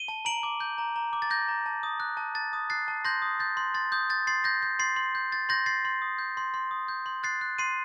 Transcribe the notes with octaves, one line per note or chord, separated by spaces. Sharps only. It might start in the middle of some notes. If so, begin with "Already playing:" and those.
Already playing: D#7 G7
A5
A#5 D7 F#7
D6
G6
A#5
A#5
D6
A6
G6 A#6
A#5
A5
D#6
F#6
A5
A5 A6
D#6
F#6 A6 C7
A5
C6 G6 A#6
D#6
G6 A6
C6
C6 A6
D#6 G6
G6 A6
C6 A6 C7
G6 A#6
G6
C6 A6 C7
C6
G6
G6 A6
C6 G6 A#6
C6 A6 C7
C6
D#6
G6
C6
C6
D#6
G6
C6
F#6 A6 C7
F#6
C6 C7 D#7